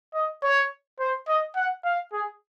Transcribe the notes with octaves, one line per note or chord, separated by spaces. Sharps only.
D#5
C#5
C5
D#5
F#5
F5
G#4